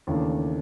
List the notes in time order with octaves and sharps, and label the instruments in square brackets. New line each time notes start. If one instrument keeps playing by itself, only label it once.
[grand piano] D#2 C#3 E3 A3 D4